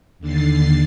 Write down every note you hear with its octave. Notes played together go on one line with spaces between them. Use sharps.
D#2 D3 A6 C7